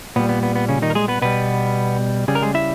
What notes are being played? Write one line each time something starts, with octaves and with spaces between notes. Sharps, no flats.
A#2 G3 B3
B3
B3
B3
C#3 C#4
D#3 D#4
A#4
G#3 G#4
B3 B4
B2 G3 B3 B4
C#3 G3 G#4
A#4
G#3 G#4
E4 E5